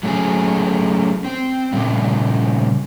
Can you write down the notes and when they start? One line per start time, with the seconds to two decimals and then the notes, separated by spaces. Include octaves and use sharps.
0.03 F#3 A3 C#4 G#4
1.25 C4
1.73 A#2 C#3 G3